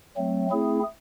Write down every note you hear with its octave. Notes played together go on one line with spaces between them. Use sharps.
F#3 A3 C4
A3 C4 E4 G#4